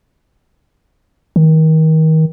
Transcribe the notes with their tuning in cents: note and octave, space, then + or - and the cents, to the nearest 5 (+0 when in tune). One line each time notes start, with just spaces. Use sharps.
D#3 +30